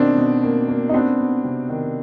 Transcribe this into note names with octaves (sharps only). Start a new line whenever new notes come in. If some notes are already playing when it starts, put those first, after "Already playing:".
Already playing: B2 D#3 C4 D4
B2
A#3
A#3
D#4
B3 C4 D4
B3
C3
D#3